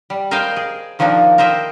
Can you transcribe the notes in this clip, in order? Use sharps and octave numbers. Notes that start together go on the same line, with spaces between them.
G3
A#4 C5 D#5 F5 G5 G#5
G#4
D#3 F3 A#3 D4 D#4
A#4 C5 D#5 E5 G5